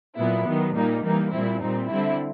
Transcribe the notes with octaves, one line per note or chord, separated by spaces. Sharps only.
A#2 F#3 B3 E4
D#3 F#3 B3
A#2 G3 A#3 D#4
E3 G3 A#3 D#4
A#2 G3 C4 E4
A#2 G3 C4 D#4
D3 G3 C4 E4